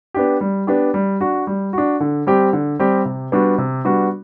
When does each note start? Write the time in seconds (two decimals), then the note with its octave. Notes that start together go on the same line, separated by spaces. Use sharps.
0.14 B3 D4 G4
0.41 G3
0.67 B3 D4 G4
0.94 G3
1.21 D4 F#4
1.47 G3
1.73 D4 F#4
2.00 D3
2.27 G3 C4 G4
2.53 D3
2.79 G3 C4 G4
3.05 C3
3.32 G3 B3 D4 F#4
3.58 C3
3.85 G3 B3 D4 F#4